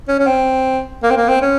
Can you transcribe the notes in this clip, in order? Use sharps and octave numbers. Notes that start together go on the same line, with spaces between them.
C#4
C#4
C4
A#3
C4
A#3
C4
C#4